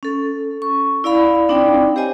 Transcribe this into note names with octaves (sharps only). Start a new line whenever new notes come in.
C#4 A4
C#6
E4 D5 F5 B5
C4 D4 D#4 D5 G5
G4 C5 C#5 D#5 G#5